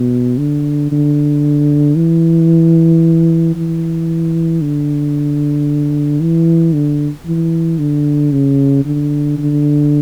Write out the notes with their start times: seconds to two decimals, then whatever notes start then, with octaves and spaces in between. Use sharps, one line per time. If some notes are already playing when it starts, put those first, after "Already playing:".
Already playing: B2
0.38 D3
0.92 D3
1.97 E3
3.55 E3
4.61 D3
6.21 E3
6.74 D3
7.26 E3
7.79 D3
8.32 C#3
8.85 D3
9.38 D3